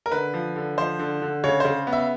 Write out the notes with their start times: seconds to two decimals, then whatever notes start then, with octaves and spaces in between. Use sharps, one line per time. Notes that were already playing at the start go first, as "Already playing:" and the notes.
0.06 A#4
0.12 D3 B4
0.34 F3
0.56 D3
0.78 F3 C5
0.99 D3
1.22 D3
1.44 C#3 C#5
1.60 C#3 C5
1.87 B3
1.93 E5